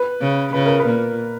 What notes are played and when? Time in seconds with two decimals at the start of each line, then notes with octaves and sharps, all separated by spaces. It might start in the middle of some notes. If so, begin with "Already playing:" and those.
Already playing: B4
0.21 C#3
0.53 C#3 B4
0.66 A#4
0.80 B4
0.86 A#2